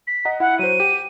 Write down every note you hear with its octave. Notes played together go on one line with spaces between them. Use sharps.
B6
D#5 F#5 A#5
E4 F#5
F#3 C5 D#7
G4